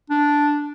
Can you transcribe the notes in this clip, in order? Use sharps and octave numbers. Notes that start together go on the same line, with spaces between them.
D4